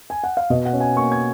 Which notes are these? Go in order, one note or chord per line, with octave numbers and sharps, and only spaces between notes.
G#5
F#5
F5
B2 D#5
F#5
C#4
G#5
A#3 C#6
G#6